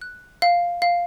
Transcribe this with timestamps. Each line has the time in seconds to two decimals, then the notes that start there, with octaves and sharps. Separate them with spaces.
0.01 F#6
0.42 F5
0.82 F5